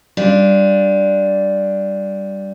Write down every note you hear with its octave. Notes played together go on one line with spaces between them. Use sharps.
G3 D4 F4